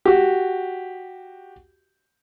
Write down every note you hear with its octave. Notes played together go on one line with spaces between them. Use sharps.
F#4 G4